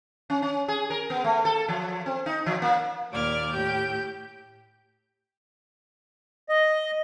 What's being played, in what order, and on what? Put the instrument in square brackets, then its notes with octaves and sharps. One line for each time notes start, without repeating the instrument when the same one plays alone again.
[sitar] C#4
C#4
G#4
A#4
B3
A3
A4
F3
C4
D#4
F3
A#3
[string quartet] D#2 A#2 D5 D6 F6 G#6
A2 G4 G6
[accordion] D#5